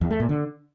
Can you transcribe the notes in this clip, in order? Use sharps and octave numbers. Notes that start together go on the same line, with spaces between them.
E2
A3
A#2
D3